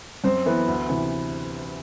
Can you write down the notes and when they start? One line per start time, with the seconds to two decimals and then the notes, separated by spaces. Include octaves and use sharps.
0.24 F#2 C4
0.46 E3 B3
0.68 D2
0.89 C3 E3